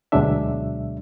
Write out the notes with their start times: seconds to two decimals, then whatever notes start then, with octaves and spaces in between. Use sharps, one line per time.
0.12 D2 B2 F#3 G#3 D4 E5